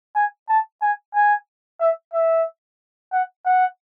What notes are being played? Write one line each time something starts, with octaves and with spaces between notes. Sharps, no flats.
G#5
A5
G#5
G#5
E5
E5
F#5
F#5